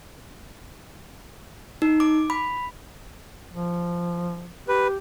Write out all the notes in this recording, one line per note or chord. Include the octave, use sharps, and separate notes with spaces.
D#4
D6
B5
F3
G4 B4